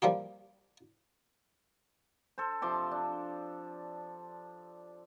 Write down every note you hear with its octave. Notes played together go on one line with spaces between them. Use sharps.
F3 G3 A#3 G4
A4 C5
C3 F3 C6 D6
D4